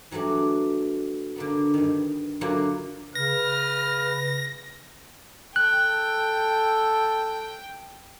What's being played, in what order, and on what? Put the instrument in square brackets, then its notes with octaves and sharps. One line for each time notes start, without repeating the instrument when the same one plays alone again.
[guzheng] E3 F#3 G3 A3 D4
D3 A#3 B3
G2 D#3
D3 F#3 A#3 C#4 E4 F4
[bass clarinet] C#3 [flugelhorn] B4 [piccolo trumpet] F6 [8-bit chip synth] A#6
[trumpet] A4 [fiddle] G5 [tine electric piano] F#6